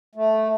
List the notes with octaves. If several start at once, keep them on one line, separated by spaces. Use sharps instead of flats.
A3